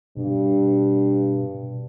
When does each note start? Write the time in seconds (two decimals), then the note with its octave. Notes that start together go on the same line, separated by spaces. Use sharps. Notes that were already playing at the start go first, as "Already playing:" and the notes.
0.17 G2 B2